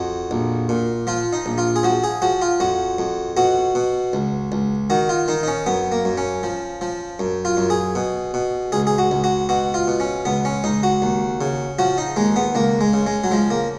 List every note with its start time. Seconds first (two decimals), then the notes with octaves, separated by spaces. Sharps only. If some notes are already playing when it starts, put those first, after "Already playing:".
Already playing: F2 F#4
0.31 A#1
0.69 A#2
1.07 F3 F4
1.33 D#4
1.46 A#1
1.58 F4
1.76 G#4
1.83 F3 F#4
2.04 G#4
2.22 F3 F#4
2.42 F4
2.60 F2 F#4
2.99 F2
3.37 B2 F#4
3.75 B2
4.13 C#2
4.52 C#2
4.90 D#3 F#4
5.09 F4
5.28 D#3 D#4
5.43 D#4
5.48 C#4
5.66 F#2 B3
5.92 A#3
6.05 F#2
6.18 C#4
6.43 F3
6.81 F3
7.19 F#2
7.45 F4
7.57 F#2
7.70 G#4
7.95 B2
8.34 B2
8.72 C#2 G#4
8.87 G#4
8.98 F#4
9.11 C#2
9.24 F#4
9.49 B2 F#4
9.74 F4
9.87 B2
10.00 C#4
10.25 C#2 B3
10.45 C#4
10.64 C#2 D#4
10.83 F#4
11.02 D#2
11.41 C#3
11.79 F3 F#4
11.98 D#4
12.17 D#2 G#3
12.36 B3
12.55 C#2 A#3
12.81 G#3
12.93 C#3
13.07 G#3
13.24 F#3
13.31 F3 G#3
13.50 A#3